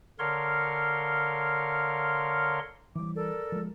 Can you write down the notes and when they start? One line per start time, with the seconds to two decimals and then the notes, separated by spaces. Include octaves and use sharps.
0.19 D3 A#4 C#5 F5 C6
2.95 E3 G3 D6
3.16 A4 A#4 D5
3.52 F3 G#3